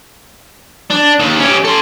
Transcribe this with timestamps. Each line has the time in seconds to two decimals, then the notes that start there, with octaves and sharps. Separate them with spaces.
0.90 D4
1.19 D#2
1.39 C#4 G4
1.65 A4 C6